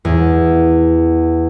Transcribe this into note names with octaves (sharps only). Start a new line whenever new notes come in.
E2